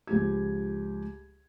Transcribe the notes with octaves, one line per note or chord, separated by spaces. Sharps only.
C#2 F3 G4 G#6